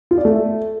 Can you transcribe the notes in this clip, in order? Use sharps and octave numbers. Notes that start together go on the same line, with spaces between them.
F4
D5
A3